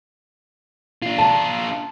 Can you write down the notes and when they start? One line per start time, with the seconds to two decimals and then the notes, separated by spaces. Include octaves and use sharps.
1.03 D4 F4
1.18 A5